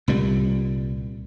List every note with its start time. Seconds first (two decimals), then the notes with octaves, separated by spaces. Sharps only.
0.08 C2 A#2 G3